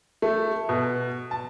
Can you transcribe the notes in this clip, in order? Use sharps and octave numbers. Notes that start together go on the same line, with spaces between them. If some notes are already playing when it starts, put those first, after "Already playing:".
A3
B2
A5